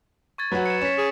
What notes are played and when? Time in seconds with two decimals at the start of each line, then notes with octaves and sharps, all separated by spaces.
0.38 C#6 G#6 A6
0.52 F#3 F#4 B4
0.66 C#7 E7
0.81 C#4 B6 E7
0.98 G#4